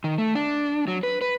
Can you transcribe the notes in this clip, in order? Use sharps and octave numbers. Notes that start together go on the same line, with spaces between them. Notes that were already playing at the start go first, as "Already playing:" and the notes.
D#3
A3
D4
F#3
B4
B4